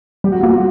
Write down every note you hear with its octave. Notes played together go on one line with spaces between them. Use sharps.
G3 G4
F#4
A#3 F4
F#4